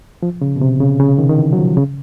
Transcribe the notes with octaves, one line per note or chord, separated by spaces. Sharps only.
F3
C#3
B2
C3
C#3
C#3
D#3
D#3
E3
F#3
F3
C#3